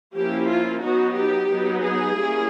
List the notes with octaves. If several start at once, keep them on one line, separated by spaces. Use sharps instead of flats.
F3 A#3 C#4 E4 G4
F4
F#3 B3 D#4 F#4
G4
F#3 B3 D#4
G#4
G3 A#3 C#4 E4